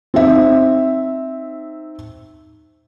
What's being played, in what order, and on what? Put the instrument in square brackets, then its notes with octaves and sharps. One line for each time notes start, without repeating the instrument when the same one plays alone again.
[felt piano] C4 D#4 E5